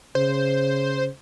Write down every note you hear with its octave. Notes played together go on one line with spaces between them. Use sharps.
C#3 C5